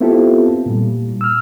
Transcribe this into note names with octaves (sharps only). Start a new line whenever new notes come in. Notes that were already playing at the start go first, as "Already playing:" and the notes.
B3 C4 E4 F4 G4 A4
A#2 G3
E6 F6